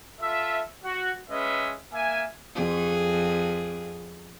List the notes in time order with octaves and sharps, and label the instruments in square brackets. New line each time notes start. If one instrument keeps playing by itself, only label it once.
[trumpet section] F4 A4 E5
F#4
G#3 C#4 B4 D#5 E5
A#3 E5 G#5
[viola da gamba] F2 G#4